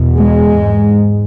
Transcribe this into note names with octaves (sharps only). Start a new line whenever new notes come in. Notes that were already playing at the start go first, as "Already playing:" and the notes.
Already playing: E2 B2
G#3
G#2